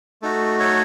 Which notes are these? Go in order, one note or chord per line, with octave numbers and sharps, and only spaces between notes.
A3 D#4 F#4 A4
A4 C#5